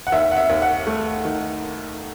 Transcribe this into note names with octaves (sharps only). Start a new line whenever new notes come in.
F#5
D#2 E5
F#5
E5
D#2
F#5
A3
D#3